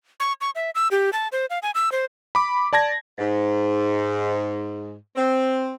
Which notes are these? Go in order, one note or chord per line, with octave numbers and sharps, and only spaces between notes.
C#6
C#6
E5
E6
G4
A5
C5
F5
G#5
E6
C5
B5 D6
D5 A5 G#6 A#6
G#2
C4